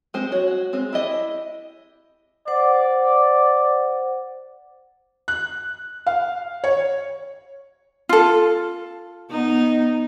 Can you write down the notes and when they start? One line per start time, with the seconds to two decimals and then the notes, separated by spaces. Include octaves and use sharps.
0.14 G#3 C4 C5
0.32 F#4 C#5
0.48 F#4
0.73 G#3 C4
0.93 E4 G4 D#5
2.48 C5 D5 F#5
5.28 F#6
6.06 F5
6.64 C#5
8.09 F4 A4
9.31 B3 D#4